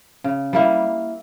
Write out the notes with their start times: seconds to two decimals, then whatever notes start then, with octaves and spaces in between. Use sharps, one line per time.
0.24 C#3
0.53 G3 A#3 E4